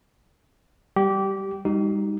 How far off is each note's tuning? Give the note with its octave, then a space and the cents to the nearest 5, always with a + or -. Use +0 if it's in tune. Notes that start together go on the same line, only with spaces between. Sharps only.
G3 +0 G4 -20
G3 +40 D#4 +0 F#4 +45